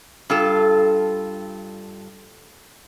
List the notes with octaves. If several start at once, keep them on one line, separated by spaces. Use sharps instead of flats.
G2 F4 A4